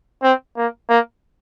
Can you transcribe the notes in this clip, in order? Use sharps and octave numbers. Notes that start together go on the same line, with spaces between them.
C4
A#3
A#3